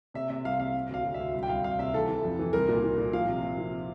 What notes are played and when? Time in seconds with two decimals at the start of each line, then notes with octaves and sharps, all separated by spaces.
0.14 C3 E5
0.30 C3 E5
0.45 C2 F5
0.59 C3 F5
0.74 C3
0.89 D2 F5
1.05 D2
1.14 E5
1.20 D2
1.34 C2
1.43 G5
1.49 C2 F5
1.63 C2 F5
1.79 C3 E5
1.94 E3 A4
2.09 E3
2.24 F2
2.39 E3
2.53 C2 A#4
2.69 A#2
2.84 A#2
2.98 A#2
3.13 F3 F5
3.28 C3
3.43 C3
3.58 F3